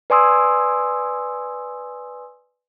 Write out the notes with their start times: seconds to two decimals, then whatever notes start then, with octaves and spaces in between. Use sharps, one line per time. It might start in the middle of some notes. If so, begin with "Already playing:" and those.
0.10 B4 D5 G#5 C6 D#6 E6